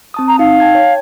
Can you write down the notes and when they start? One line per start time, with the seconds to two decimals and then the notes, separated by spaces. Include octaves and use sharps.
0.14 C4 A5 D#6
0.28 A#5
0.39 D#4 F5
0.60 G5 A5 G#6
0.75 C#5